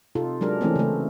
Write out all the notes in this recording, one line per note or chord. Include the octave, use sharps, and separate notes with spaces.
C3 D#4 F4 A4
F#3 G#3 D4 A#4
E3 G#3 A3 C4 C#4
C#3 A3